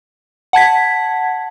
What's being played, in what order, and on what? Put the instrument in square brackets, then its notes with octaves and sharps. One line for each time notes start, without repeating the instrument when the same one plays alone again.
[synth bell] F#5 A5 G#6 B6